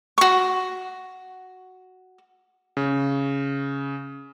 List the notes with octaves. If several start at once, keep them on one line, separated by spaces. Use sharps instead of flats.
F#4 C#6
C#3